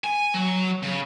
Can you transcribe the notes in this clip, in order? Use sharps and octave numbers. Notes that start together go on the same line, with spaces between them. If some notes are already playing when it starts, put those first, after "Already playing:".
G#5
F#3
C#3